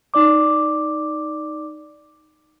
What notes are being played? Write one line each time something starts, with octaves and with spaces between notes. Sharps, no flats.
D#4 D5 D6